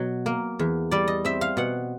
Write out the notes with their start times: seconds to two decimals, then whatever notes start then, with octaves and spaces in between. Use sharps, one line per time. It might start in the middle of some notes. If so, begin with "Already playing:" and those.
Already playing: B2 F#3
0.26 A#3
0.59 E2
0.91 G3 D5
1.07 D#5
1.25 C4 E5
1.41 F5
1.57 B2 F#5